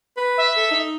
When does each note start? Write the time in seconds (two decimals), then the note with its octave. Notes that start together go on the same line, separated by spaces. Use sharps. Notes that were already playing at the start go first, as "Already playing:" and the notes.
0.17 B4
0.37 E5
0.57 A4
0.71 D#4